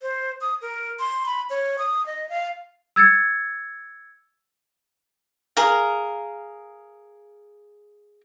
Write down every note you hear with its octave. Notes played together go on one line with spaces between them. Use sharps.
C5
D#6
A#4
C6
B5
C#5
D#6
D#5
F5
E6 G#6 A6 C#7
G#4 A#4 F5